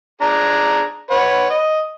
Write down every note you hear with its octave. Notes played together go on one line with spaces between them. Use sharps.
D4 G#4 A#5
B4 C#5 F#5
D#5